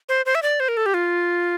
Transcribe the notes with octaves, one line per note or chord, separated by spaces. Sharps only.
C5
C5
E5
D5
C5
A#4
A4
G4
F4